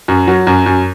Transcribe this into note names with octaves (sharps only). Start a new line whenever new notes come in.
F#2
F#3
F#2
F#2